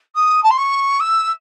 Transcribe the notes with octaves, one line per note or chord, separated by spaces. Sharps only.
D#6
A5
C6
C#6
E6